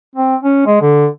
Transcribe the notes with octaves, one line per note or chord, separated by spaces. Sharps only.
C4
C#4
G#3
D3